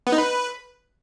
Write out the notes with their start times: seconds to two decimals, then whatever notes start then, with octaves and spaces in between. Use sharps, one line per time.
0.07 B3
0.12 D#4
0.18 B4